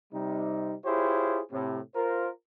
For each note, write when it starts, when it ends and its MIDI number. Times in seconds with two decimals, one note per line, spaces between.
0.13 0.75 48
0.13 0.75 55
0.13 0.75 63
0.85 1.40 64
0.85 1.40 65
0.85 1.40 67
0.85 1.40 68
0.85 1.40 72
0.85 1.40 73
1.51 1.79 45
1.51 1.79 48
1.95 2.28 65
1.95 2.28 70
1.95 2.28 72